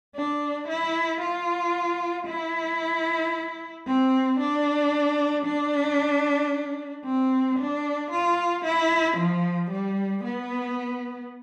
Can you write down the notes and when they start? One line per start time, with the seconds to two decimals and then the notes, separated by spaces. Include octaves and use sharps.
0.15 D4
0.68 E4
1.21 F4
2.28 E4
3.87 C4
4.40 D4
5.46 D4
7.05 C4
7.59 D4
8.11 F4
8.65 E4
9.17 F3
9.71 G3
10.24 B3